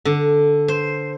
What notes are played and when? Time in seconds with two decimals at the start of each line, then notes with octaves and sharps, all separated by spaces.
0.05 D3
0.68 C5